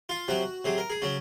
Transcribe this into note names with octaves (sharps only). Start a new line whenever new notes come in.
F4
C3 F#3 F#4
C3 F#3 G#4
A#4
G#4
C#3 F#3 C#4